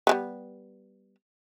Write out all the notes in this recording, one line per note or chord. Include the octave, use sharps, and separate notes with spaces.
G3 G#3 B3